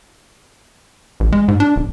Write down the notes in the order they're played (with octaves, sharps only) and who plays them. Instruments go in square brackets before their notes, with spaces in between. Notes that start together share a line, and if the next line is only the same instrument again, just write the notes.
[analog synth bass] A1
G#3
G#2
D4
D1